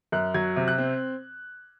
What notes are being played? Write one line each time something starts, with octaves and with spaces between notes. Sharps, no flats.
F#2 F#6
F#3 G#6
C3
F#6
C4